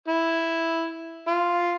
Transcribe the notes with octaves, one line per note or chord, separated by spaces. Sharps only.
E4
F4